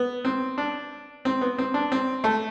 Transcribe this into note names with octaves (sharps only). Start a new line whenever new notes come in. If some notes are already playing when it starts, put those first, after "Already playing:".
Already playing: B3
C4
D4
C4
B3
C4
D4
C4
A3